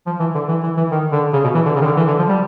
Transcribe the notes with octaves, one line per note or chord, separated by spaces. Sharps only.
F3
E3
D3
E3
E3
E3
D#3
D3
C#3
B2
E3
D3
C#3
D#3
D3
E3
D3
F3
G3